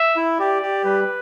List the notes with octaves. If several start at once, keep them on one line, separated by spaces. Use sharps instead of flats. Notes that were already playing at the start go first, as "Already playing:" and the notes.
Already playing: E5
E4
G4 D5
G4
G3 B4